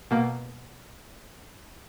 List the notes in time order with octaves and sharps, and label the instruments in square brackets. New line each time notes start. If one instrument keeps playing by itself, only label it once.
[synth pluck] B2 A#3